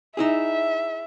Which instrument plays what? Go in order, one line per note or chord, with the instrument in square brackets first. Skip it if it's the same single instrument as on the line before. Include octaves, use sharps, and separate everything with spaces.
[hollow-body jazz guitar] D#4 E4 G#4 [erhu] E5